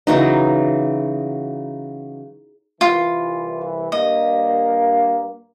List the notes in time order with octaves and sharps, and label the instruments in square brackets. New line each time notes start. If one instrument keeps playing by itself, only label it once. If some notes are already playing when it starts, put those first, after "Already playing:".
[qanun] C#3 E3 F#3 D#4
[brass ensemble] C2 E3 [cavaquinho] F4
[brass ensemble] G2 A#3 [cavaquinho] D#5